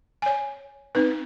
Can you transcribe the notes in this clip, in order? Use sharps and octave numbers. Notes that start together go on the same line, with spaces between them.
C#5 G#5
C4 D#4 B4